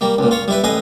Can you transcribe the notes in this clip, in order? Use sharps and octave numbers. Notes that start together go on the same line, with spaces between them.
G3 A#3
C#2 A#2
F4 C#5
G3 E4 B4
A1 G#4 B4 D#5